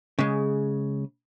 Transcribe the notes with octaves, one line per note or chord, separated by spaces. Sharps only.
C#3 G#3